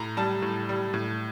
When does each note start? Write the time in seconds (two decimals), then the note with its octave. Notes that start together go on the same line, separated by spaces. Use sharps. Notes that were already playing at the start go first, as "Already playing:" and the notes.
Already playing: A2 A#5
0.17 G3 A5
0.42 A2
0.69 G3
0.94 A2